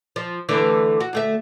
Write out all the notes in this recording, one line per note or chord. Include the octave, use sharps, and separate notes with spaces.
F3
D3 E3 A3
F#4
D2 A3 E5